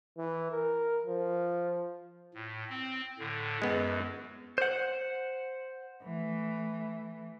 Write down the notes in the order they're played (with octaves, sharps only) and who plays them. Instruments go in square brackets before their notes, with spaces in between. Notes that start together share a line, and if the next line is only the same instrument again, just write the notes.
[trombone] E3
A#4
F3
[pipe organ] A2
C4
A2 D3
[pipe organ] F#2 [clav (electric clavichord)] G#3 B3
[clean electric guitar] C5 F#5
[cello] E3 A3